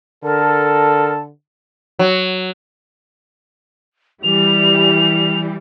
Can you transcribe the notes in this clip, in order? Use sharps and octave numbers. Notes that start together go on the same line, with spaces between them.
D3 A4 A#4 A5
F#3
E3 G3 F7